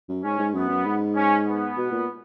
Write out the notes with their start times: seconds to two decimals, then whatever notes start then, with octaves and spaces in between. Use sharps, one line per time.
0.09 F#2
0.24 G#2 C#4
0.39 G#2
0.54 F#2 B3
0.69 F#2
0.86 G#2
1.16 C#4
1.46 B3
1.77 B2
1.92 A#2